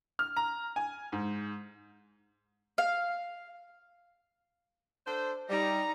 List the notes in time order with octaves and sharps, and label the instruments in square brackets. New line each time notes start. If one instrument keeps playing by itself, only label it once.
[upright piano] F6
A#5
G#5
G#2
[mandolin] F5
[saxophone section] D4 A4 C5
[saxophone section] G3 [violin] D#4 A#5